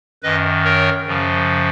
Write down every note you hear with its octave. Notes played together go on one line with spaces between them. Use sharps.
F#2 D#3 B4 D#5
A#4 C#5
F#2 C#3 F3